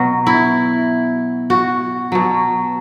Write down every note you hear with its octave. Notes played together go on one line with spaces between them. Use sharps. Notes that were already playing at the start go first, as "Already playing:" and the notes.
Already playing: B2 F#3 F#4
E4
F#4
B2 F#3